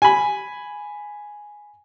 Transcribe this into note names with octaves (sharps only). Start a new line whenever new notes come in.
G#5 B5